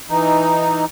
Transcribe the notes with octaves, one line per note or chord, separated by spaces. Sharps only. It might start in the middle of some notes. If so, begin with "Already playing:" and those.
E3 D#4